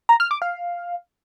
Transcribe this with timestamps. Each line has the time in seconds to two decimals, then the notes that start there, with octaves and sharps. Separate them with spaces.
0.09 A#5
0.20 F6
0.31 D6
0.42 F5